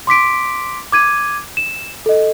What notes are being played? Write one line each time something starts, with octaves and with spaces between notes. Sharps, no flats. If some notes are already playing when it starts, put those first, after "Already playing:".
C6 D6 B6 D7
D6 G#6 D#7
E7
A4 D#5